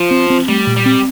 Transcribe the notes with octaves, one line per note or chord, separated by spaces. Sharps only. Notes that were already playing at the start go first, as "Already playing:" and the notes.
Already playing: F3
C4
C4
G3 A3
A#2
G3
C4